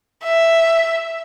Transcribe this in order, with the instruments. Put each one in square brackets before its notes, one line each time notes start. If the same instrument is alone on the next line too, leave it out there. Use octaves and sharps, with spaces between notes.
[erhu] E5